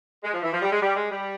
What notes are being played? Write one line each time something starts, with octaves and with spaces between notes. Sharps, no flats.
G#3
F3
E3
F3
G3
G#3
G3
G#3
G3